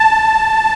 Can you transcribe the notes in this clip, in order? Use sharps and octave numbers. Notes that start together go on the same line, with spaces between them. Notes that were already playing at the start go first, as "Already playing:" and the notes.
Already playing: A5